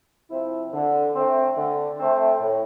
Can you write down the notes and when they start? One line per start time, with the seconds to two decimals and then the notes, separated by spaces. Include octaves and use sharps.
0.29 C3 F3 C4 E4
0.72 D3
1.15 A3 C4
1.57 D3
1.99 A3 C4
2.40 A2